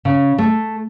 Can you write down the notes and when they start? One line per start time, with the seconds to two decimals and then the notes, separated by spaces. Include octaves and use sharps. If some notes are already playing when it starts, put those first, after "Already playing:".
0.05 C#3
0.38 A3